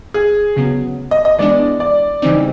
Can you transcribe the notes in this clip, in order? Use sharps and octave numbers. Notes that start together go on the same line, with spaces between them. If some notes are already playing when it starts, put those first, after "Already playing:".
G#4
D2 C#3 F#3 B3
D#5
D#5
E3 G#3 B3 D4 D5
D5
C#3 E3 G3 C4 D#4